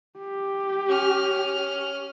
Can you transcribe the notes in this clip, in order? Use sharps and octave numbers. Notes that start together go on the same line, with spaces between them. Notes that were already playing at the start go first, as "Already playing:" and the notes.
G4
C#4 F6